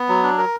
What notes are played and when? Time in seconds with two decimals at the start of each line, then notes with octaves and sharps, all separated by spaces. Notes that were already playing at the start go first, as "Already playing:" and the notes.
Already playing: B3
0.09 F#3
0.23 D4
0.38 A#4